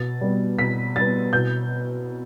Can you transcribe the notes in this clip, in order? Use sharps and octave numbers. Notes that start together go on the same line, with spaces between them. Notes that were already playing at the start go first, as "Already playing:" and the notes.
Already playing: B2 A6
G3 B3
B2 B6
G3 B3 A6
B2 G6